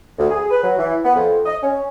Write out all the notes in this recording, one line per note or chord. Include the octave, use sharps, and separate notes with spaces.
D2
G#4
B4
F#3
E3
B3
F2
D#5
C#4